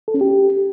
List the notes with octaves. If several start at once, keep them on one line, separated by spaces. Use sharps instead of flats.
A4
C#4
G4